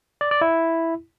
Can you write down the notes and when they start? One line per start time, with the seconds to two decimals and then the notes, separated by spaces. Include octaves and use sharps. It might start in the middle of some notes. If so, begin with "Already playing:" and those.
0.21 D5
0.31 D5
0.41 E4